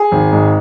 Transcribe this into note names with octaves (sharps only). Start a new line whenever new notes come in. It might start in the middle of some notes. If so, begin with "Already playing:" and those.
Already playing: G#4
G#1
G#2